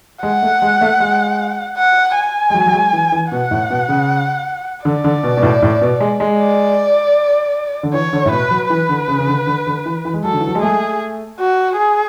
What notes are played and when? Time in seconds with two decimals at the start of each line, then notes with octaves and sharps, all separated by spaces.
0.23 G#3 F#5
0.43 A3
0.62 G#3
0.81 A3
1.00 G#3
1.77 F#5
2.16 G#5
2.50 G#3
2.54 F#3
2.66 F#3
2.73 G#3
2.93 E3
3.12 E3
3.31 B2 F#5
3.51 A2
3.70 B2
3.88 C#3
4.85 D3 D5
5.04 D3
5.23 B2
5.37 B2
5.42 A2
5.62 A2
5.81 B2
6.00 G#3
6.20 G#3
6.38 D5
7.83 D3
7.94 E3 C#5
8.13 D3
8.25 A2
8.31 B2 B4
8.51 F#3
8.70 E3 B4
8.89 D3
9.08 C#3
9.19 C#3
9.27 D3
9.47 D3
9.67 D3
9.86 E3
10.05 E3
10.14 G#3
10.24 F#3 A4
10.33 D3
10.40 E3
10.48 F#3
10.55 G#3
10.62 A3 G#4
11.40 F#4
11.78 G#4